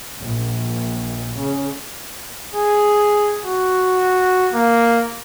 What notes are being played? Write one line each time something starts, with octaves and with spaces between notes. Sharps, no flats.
A#1
C#3
G#4
F#4
A#3